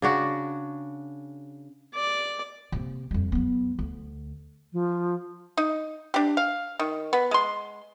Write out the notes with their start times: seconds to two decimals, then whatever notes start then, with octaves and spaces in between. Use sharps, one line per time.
0.02 C#3 D4 F#4
1.94 D5
2.72 C3 A#3
3.11 F2 G3
3.32 F#3 B3
3.79 D2
4.72 F3
5.57 D#4
6.14 D4 G4
6.37 F5
6.79 D#3
7.13 B3
7.31 G#3 C6